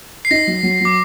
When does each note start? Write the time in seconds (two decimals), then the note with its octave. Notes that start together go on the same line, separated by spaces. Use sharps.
0.25 C7
0.31 D#4 A#6
0.47 F#3
0.63 F#3
0.80 F#3 D6